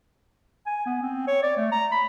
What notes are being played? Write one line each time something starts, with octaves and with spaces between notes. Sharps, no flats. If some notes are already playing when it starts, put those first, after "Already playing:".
G#5
B3
C4
C#5
D5
A3
A#5
B5